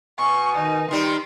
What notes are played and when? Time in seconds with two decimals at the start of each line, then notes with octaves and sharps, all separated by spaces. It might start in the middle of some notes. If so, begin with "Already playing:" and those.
0.19 B2 G#5 C#6
0.55 D#3 D#4
0.91 D#3 G3 D#4 C6